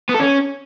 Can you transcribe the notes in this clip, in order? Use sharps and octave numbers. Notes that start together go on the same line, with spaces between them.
B3
A4
C#4